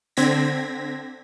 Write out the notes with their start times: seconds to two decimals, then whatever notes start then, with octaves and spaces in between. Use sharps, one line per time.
0.17 D3 C4 G#6 A#6 B6